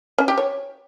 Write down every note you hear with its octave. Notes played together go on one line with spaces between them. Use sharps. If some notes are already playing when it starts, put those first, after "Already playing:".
C#4
G4
C#5